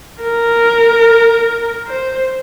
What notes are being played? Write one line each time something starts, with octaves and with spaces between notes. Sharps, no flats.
A#4
C5